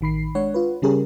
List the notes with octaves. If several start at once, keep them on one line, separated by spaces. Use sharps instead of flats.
A1 D#3 B5 C7
G#3 D4 C#5 F#5
F4 B4
C#3 G3 C#4 G4 G#4 A#4